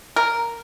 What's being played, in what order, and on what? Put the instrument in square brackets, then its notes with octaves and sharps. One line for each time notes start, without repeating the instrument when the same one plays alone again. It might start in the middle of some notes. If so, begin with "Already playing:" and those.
[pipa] A#4